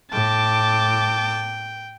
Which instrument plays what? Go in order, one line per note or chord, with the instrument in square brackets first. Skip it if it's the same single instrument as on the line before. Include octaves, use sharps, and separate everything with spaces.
[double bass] A2 [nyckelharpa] G5 [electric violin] A5 D6